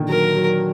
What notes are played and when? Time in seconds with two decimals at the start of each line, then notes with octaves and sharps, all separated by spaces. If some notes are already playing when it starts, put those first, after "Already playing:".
Already playing: A#2 D3 D#3
0.09 F#3 A#4
0.36 F#3